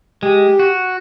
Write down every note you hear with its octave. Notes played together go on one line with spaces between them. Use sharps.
G#3 G4
F#4